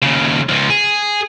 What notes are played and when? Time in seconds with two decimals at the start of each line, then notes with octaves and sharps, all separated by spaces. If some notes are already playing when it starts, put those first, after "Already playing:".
0.03 D#2 C#3
0.49 C#2 F3
0.70 G#4